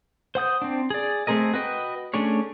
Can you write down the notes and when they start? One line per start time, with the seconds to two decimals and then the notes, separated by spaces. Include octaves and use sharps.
0.35 C5 F#5 D#6 G6
0.62 C4 D4
0.90 G#4 D5
1.27 A3 C4 G#4 A#4 D#5
1.53 F#4 B4 D#5 G5
2.14 A3 C#4 D4 G#4 C#5